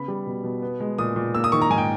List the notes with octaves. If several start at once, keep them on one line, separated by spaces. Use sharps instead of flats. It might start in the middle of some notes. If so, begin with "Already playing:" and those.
Already playing: C#3 B3 B5
G3
B2
B2
B3
G#3
A#2 D#6
A#2
A#3 E6
D#6
D#3 C#6
A#5
G#2 G#5
G5